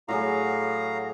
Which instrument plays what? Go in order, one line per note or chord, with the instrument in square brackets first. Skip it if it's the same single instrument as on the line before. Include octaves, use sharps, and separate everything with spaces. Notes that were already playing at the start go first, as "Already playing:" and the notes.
[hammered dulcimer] A2 F#3 G#4 [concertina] F#4 F5 A#5